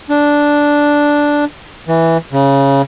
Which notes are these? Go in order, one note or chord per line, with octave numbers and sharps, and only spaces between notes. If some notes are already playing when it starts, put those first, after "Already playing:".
D4
E3
C#3